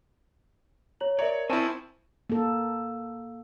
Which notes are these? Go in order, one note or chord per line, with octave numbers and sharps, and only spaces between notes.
C#5 A#5 F#7
A#4 C#5 D5 E5 A#5
C4 E4 C5 G#5 A5 C#6
A#3 A4